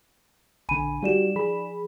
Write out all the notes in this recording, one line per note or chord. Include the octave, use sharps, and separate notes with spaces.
A#1 D3 G#5 B5 D#7
G3 D#4 F#4 G4 D5 E7
F3 G#4 B5